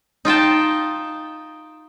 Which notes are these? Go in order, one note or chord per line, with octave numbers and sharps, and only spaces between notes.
D#4 F4 G5 A5